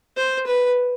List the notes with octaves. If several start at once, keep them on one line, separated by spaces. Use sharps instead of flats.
C5
B4